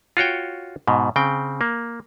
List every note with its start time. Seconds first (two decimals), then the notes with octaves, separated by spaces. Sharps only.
0.17 F4 F#4 C#5 G5
0.87 G#2 B2
1.16 C#3 C4 G5
1.61 A#3